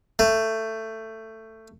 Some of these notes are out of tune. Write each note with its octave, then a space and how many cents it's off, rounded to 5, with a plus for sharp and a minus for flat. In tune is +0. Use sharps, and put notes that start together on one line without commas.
A3 +15